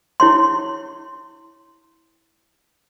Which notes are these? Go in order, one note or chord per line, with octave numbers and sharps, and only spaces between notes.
E4 C#5 C6